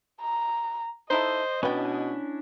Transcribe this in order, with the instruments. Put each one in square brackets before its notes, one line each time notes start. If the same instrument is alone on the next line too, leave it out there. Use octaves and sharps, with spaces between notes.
[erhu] A#5
[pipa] D#4 E4 A4 [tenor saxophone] C5 [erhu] D#5
[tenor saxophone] B2 [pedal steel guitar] C#4 D4 E4 [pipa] B4 G5